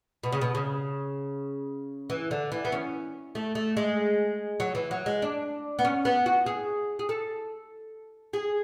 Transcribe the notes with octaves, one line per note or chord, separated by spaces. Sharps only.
B2
C#3
B2
C#3
E3
D3
E3
B3
C#4
A3
A3
G#3
F#3
E3
F#3
G#3
D4
B3
C#4
B3
F#4
G#4
G#4
A4
G#4